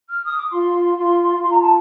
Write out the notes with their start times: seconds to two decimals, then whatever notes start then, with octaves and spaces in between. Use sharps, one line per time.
0.09 F6
0.23 D#6
0.37 D6
0.50 F4 C6
0.96 F4
1.42 F4 C6
1.52 A#5
1.61 A5